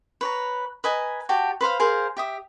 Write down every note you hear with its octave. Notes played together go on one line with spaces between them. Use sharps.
B4 C#5 A#5
B4 D#5 G#5 A#5
F#4 G4 A5
B4 C5 F5 B5
G#4 A#4 C5 F5
G4 E5 D#6